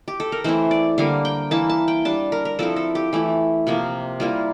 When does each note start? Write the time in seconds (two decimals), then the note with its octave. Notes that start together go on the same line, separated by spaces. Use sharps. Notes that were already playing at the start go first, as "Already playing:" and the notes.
0.08 G4
0.20 A4
0.32 A#4
0.44 E3 A3 C4 E4 C5
0.71 D5
0.98 D3 G3 A#3 F5
1.25 G5
1.51 E3 A#3 E4 A5
1.70 A5
1.88 G5
2.05 G3 D4 A5
2.32 A#4
2.45 A#4
2.59 F3 C4 E4 A4
2.76 A4
2.95 G4
3.13 E3 A3 E4
3.67 C3 F3 A#3
4.20 G3 A#3 E4 F4